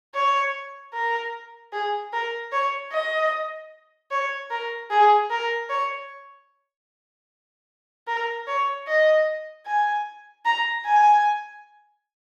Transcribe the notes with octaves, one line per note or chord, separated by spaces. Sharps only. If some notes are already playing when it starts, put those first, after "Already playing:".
C#5
A#4
G#4
A#4
C#5
D#5
C#5
A#4
G#4
A#4
C#5
A#4
C#5
D#5
G#5
A#5
G#5